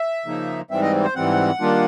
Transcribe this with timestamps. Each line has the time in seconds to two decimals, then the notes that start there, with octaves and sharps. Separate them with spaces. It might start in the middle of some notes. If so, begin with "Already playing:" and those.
Already playing: E5
0.25 C#3 F3 A#3 D#4
0.70 G#2 E3 G3 C4 E5
0.82 D#5
1.04 C5
1.15 G#2 E3 G3 C4 F#5
1.60 D#3 G3 A#3 D4 F4